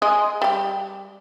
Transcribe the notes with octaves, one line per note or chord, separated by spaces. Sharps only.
G#3 G#4 D#5
G3 G4